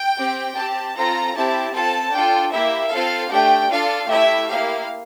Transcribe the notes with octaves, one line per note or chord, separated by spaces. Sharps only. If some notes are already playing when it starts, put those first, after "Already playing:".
Already playing: G5
C4 G4
C4 G4 A5
C4 F4 A4 A#5
C4 E4 G4 A5
C4 F4 A4 A5
D4 F4 A4 G5
A#3 E4 G4 E5
C4 F4 A4 F5
A3 D4 G4 G5
D4 F4 A4 F5
A3 E4 G4 E5
A#3 E4 G4 F5